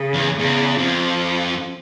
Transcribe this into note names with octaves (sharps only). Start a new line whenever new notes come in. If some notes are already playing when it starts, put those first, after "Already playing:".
Already playing: C#3
E2
E2 C#3
F2 F3